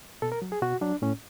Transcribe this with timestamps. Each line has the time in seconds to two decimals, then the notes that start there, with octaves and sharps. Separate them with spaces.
0.22 B2 A4
0.32 A#4
0.42 F#3
0.52 G#4
0.62 B2 F#4
0.81 F#3 D4
1.02 A2 C#4